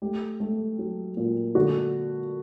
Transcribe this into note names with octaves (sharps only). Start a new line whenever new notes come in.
A3 G4
A3
F#3
A#2
D3 F#4